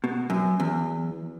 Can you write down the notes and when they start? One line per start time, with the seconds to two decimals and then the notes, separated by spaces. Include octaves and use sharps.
0.04 B2
0.30 F#2
0.60 E2